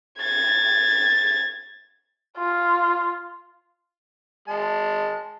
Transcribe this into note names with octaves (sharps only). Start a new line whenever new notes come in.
G#6 A6
F4
G#3 A5